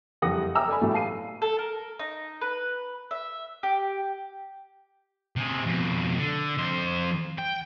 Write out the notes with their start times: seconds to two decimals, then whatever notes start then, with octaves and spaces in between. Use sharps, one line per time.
0.22 F#1 F2 G3 F#5 D#6 A#6
0.55 G5 A#5 D6 E6 F6
0.68 A4 D5 G#5 B5
0.81 A2 C3 F#3 A3
0.93 F5 A5 C7 D#7
1.42 A4
1.58 A#4
1.99 D#4
2.41 B4
3.11 E5
3.63 G4
5.36 C3 G#4
5.66 F2 B2
6.18 D3
6.58 F2 C5
7.38 G5